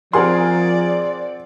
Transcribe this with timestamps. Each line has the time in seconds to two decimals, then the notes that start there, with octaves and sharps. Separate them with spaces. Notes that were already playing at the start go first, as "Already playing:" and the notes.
0.13 F3 C4 G#4 A#4 D5 F#5 C6 F6